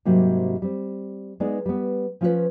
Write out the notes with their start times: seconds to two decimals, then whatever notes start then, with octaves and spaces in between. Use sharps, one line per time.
0.05 G#2 C3 F#3 G3 A#3
0.62 G3 C4
1.40 G#3 B3 D#4 D5
1.66 G3 B3
2.21 F3 C#4 F4 F#4 B4 C#5